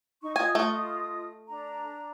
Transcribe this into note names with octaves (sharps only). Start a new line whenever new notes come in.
D#4 C#6
F4 D#5 G#5 D#6
A3
D4 A#5